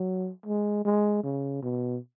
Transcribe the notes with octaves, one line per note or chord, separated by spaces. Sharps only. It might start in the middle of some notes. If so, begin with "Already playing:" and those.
Already playing: F#3
G#3
G#3
C#3
B2